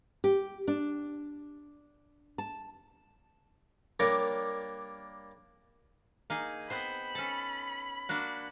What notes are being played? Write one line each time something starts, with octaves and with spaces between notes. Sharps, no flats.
G4
D4
A5
G3 A#3 D4 A#4 C#5
A#3 D#4 G#4
B3 C4 C5 B5
C#4 A4
A#3 D4 F#4